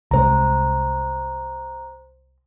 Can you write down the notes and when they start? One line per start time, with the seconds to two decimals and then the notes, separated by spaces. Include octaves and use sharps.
0.11 C2 C3 G#3 C5 A#5